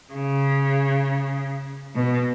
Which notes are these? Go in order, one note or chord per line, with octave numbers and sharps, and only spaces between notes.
C#3
B2